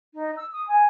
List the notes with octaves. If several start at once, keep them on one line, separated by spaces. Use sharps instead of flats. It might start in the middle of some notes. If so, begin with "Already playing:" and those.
D#4
E6
D#6
G#5